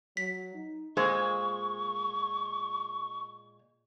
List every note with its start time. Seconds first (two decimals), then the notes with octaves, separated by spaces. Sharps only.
0.17 F#3 B6
0.53 D#4
0.97 A#2 G#3 C5 C#6